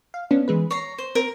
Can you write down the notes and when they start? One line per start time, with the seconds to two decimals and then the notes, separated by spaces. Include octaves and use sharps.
0.14 F5
0.31 B3 C#4 D4
0.48 E3 G#3 B4
0.71 C#5 A#5 C7
0.98 C5
1.15 C4 A#4